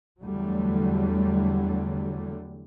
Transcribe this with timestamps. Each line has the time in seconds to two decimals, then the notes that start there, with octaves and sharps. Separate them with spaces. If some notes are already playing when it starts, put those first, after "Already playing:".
0.20 E2 D3 F#3 G3 A3